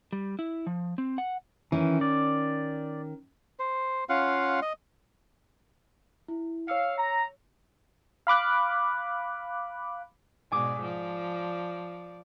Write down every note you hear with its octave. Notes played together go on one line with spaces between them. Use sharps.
G3
E4
F3
C4
F#5
D#3 E3 C#4
D5
C5
C#4 F4 F5 F#5
D#5
E4
C#5 F5 E6 C#7
A#5
F5 B5 D6 F#6
G#2 B2 D5 G#5 D6 D#6
F3 D5